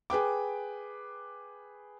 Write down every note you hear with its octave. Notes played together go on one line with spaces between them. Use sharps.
G#4 B4 G5 D6